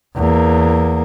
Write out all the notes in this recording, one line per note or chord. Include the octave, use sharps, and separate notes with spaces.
E2 A#3